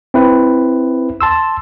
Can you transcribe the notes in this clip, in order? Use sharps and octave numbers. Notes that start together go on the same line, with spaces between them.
C4 E4 B4
A5 C6 E6